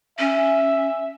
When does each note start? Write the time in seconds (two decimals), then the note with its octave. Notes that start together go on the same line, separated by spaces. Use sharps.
0.19 C#4 E5